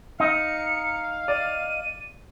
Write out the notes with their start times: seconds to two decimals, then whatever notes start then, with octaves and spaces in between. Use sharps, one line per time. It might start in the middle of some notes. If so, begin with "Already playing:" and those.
0.20 D#4 F5 C#7
1.28 D5 D#7